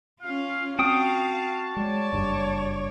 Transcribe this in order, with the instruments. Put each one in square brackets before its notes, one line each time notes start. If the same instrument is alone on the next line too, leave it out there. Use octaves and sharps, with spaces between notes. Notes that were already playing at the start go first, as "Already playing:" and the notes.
[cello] C#4 F4 [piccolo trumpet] F5
[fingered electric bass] C4 [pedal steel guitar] F#4 G5 D#6 [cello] F5 [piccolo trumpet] A5
[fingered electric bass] G#3 [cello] C#5 D5
[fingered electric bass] F#1 G2